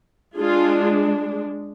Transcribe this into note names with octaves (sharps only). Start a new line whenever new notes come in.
G#3 D4 F4 G#4